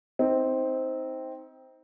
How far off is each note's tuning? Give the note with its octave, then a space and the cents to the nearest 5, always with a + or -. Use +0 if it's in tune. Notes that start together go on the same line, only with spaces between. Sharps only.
C4 +0 D#4 +30